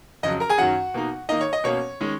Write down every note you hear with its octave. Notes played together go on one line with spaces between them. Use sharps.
F2 C#3 F#3 D#5
A#4 A#5
G#4 G#5
F#2 D#3 F#3 C#4 F#4 F#5
B2 A#3 D#4
D#3 A#3 D#4 D#5
C#5
D#5
B2 A#3 C#4 C#5
D#3 G#3 C#4